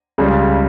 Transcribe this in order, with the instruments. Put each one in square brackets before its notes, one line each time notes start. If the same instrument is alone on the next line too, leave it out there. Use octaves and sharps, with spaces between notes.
[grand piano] C#2 C#3 G3